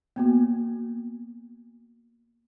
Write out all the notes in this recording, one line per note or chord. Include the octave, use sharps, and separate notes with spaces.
A#3 B3 F#4